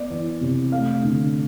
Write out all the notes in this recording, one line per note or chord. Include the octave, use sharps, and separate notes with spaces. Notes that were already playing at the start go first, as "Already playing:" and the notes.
Already playing: B3 D5
E3
C3
A3 F5
D3